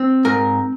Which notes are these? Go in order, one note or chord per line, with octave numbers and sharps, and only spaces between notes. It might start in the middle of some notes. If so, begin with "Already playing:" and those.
Already playing: C4
G#2 A#4